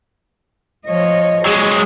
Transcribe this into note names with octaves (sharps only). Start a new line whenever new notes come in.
F3 C#5 D#5
F#3 G#3 G#4